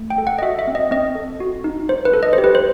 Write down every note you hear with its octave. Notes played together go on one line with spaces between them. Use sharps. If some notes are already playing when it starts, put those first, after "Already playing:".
Already playing: A3
G5
A4
F#5
D#5
F#4 E5
E5
C4
D#5
C4 D#5
A4
F#4
D#4
D#4 C5
B4
A4
D#5
C5
G4
B4
C5